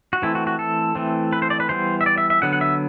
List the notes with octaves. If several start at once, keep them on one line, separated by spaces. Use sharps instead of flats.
F#4
E3 A3 C4 E4
F#4
F#4
A4
E3 A3 C4
B4
C5
D5
B4
E3 G3 B3 C5
E5
D5
E5
E5
D3 F#3 B3 F#5
F#5
E5